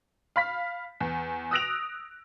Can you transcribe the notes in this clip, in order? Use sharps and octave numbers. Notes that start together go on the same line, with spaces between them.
F5 B5 B6
E2
D#6 E6 F#6 A#6 D7 F7